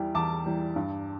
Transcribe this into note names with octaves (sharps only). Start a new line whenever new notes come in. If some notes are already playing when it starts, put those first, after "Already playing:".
Already playing: E2 E3 G3
E2 A5 D6
E3 G3
G2